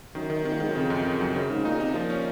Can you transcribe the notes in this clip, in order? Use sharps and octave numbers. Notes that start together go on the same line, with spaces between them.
F#2 D#3
D#3
C3 D#3
A#2
G#2 D#3
F#2
F2 C#3
F#2
C#3
F#3
F#2 C#3
G#2 C#3
A#2 D#4
C3 D#4
A#2 F3
C#4